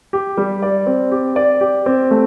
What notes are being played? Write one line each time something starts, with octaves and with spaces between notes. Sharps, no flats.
G4
G3
D5
C4
G4
D5
G4
C4
A3